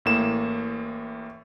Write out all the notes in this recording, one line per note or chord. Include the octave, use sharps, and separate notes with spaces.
A1 A2 A#3 E7